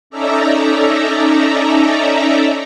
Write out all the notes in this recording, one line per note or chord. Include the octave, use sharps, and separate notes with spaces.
C#4 D#4 A4 D5 E5 A#5